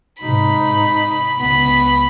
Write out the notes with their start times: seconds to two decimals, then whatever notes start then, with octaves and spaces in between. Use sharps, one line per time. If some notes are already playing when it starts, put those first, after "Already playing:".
0.22 G#2 C3 D#4 B5
1.39 C#2 B3 B5